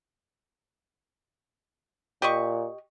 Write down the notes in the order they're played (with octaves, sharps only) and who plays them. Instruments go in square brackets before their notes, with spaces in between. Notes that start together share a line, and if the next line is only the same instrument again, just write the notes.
[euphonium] A#2 [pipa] G4 D#5 C#6